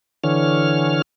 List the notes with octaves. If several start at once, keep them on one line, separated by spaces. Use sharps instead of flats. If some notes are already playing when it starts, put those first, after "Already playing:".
D3 E3 C#5 F6